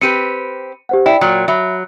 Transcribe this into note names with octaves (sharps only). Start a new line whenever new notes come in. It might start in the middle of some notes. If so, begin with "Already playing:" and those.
C4 G4 B4 C#7 D#7
G4 C5 F#5
E4 D5 G5
A#2 F#3
F#3 E5 B5